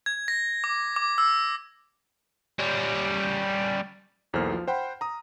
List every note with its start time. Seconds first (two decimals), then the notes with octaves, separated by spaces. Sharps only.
0.06 G#6
0.28 A#6
0.64 D6
0.96 D6
1.18 E6
2.59 G3 C#4
4.33 B1 E2 A#3 A4 C5 F6
4.53 F3
4.68 C5 F#5 G5 B5 C6
5.01 A#5 D#6